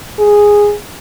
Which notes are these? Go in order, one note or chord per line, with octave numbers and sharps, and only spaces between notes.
G#4